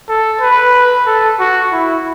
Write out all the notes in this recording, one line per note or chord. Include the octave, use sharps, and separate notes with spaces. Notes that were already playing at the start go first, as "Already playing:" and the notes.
A4
B4
A4
F#4
E4